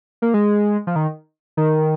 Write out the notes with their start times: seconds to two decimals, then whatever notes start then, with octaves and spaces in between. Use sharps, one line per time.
0.22 A#3
0.34 G#3
0.87 F3
0.96 D#3
1.57 D#3